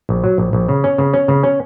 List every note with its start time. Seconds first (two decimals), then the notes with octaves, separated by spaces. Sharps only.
0.09 A#1
0.24 F#3
0.38 A#1
0.53 A#1
0.68 C#3
0.84 C#4
0.98 C#3
1.14 C#4
1.28 C#3
1.43 C#4